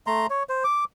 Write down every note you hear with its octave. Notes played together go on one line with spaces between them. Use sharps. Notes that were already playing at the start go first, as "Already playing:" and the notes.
A3 A#5 C6
C#5
C5
D6